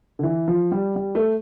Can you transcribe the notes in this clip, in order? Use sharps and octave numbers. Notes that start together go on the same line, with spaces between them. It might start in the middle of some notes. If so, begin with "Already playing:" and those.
D3
E3
F3
G3
G3
A3